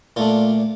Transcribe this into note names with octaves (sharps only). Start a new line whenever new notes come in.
A#2 A3 D4 F4